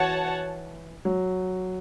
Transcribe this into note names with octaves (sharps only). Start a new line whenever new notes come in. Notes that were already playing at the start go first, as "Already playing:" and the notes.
Already playing: E3 F#4 C#5 F#5 A5
F#3